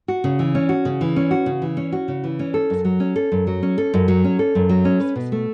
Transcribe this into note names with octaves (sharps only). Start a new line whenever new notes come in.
F#4
C#3
E3
C#4
F#4
C#3
E3
C#4
F#4
C#3
E3
C#4
F#4
C#3
E3
C#4
A4
F#2
F#3
C#4
A4
F#2
F#3
C#4
A4
F#2
F#3
C#4
A4
F#2
F#3
C#4
B4
B2
A3